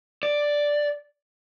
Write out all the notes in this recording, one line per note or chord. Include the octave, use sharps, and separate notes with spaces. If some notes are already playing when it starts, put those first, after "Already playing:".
D5